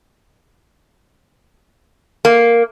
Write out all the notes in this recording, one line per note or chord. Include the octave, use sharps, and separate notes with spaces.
A#3